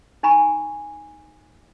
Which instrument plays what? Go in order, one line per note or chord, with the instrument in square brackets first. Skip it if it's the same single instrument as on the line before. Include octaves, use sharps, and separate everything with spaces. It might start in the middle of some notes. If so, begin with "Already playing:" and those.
[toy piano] D#4 G#5 A#5 B5 C#6